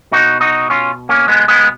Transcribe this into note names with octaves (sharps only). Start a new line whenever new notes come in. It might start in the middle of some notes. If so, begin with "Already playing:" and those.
B2 D#4 F#4
D#4 F#4
C#4 F4
A#3 C#4
G#3 B3
G#3 B3